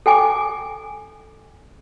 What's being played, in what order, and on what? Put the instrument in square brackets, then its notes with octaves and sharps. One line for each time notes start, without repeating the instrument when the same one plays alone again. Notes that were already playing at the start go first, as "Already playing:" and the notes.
[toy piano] A4 G5 G#5 D6